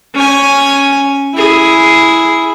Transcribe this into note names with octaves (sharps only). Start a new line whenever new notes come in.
C#4 G#5
E4 G#4